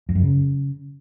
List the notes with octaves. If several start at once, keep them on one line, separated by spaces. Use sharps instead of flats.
F2
F#2
C#3